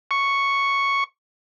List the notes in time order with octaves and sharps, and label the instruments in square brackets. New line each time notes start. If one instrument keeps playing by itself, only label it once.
[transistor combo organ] C#6